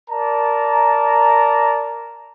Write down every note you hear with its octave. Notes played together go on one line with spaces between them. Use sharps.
A#4 D5 A5 A#5